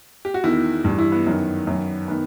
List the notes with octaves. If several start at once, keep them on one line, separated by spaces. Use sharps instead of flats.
G4
F#4
E2 D#3 E4
G2
E3
E4
B3
F#2 D#3
F#2 D#3
D#3 B3